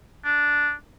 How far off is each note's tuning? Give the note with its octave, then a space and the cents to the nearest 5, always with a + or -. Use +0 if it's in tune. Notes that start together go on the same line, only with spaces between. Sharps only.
D4 -5